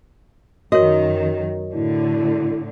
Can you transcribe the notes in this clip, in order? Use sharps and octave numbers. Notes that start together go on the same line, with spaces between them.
F#2 D#3 F#4 A#4 C#5 D#5
A2 D3 E4